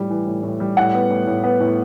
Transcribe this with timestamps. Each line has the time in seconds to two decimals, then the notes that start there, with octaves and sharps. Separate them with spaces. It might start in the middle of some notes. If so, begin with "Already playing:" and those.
Already playing: A2 G3
0.10 E3
0.26 A2
0.43 A2
0.60 G3
0.77 A2 F#5
0.93 B3
1.10 A2
1.27 A2
1.44 B3
1.60 A2